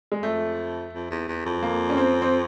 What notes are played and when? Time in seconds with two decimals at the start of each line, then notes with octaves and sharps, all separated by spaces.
0.12 G#3
0.22 F2 A3
0.93 F2
1.10 E2
1.28 E2
1.45 F2
1.63 A#3
1.90 C#4
1.97 C4
2.22 C4